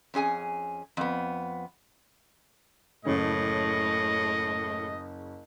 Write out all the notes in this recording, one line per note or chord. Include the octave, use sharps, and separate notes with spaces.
F2 C#4 G#4 G#5
F2 B3
F#1 A2 C#3 C#4 D#5